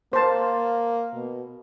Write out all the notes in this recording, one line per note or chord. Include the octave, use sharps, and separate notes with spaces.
A#3 C5 A5
B2